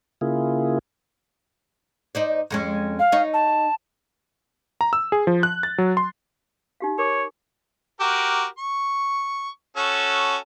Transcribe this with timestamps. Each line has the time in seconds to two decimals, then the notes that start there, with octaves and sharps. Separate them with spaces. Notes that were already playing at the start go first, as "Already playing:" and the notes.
0.21 C#3 A#3 E4 F4 G#4
2.15 D#4 C5 D5
2.51 F2 G#3 C#4
2.99 F5
3.12 D#4 C#5
3.34 A5
4.81 A#5
4.93 E6
5.12 G#4
5.27 F3
5.43 F#6
5.63 A6
5.78 F#3
5.97 C6
6.80 D#4 G4 F5
6.98 A#4 C#5 D6
8.00 F#4 G4 A#4
8.58 C#6
9.77 C#4 F#4 A4